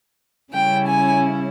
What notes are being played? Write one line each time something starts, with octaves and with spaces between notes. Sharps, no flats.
C#3 G3 C#4 E4 G5
G#5